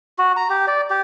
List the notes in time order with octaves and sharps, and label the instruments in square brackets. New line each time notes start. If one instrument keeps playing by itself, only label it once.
[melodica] F#4
A#5
G4
D5
G4